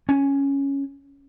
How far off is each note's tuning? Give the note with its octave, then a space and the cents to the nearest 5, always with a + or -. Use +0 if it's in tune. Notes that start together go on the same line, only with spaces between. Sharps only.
C#4 +0